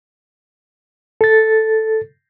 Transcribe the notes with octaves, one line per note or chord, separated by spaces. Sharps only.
A4 A6